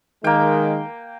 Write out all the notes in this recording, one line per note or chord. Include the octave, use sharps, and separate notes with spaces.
D#3 G#3 A#3 G5